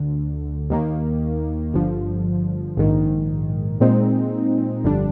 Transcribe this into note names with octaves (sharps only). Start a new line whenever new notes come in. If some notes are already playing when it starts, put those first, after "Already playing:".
Already playing: D2 D3
D#2 D#3 A#3
G1 G2 D3 F3
A#1 G#2 D#3
A#2 G#3 C4 D#4
G1 F2 D3 G3 D4